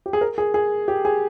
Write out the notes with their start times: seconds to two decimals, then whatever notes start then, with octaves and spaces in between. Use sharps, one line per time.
0.06 G4
0.13 G#4
0.21 A#4
0.38 G#4
0.54 G#4
0.88 G4
1.05 G#4